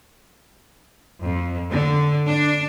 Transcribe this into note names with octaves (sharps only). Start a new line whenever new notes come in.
F2
D3
D4